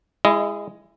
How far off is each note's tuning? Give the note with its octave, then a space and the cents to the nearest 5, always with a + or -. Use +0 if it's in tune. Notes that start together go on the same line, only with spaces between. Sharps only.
G#3 -15 E4 +20 D#5 +0